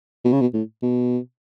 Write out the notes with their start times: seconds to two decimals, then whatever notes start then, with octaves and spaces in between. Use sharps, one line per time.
0.25 B2
0.33 C#3
0.41 B2
0.53 A2
0.82 B2